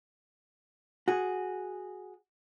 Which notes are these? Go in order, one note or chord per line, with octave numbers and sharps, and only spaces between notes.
F#4 G#4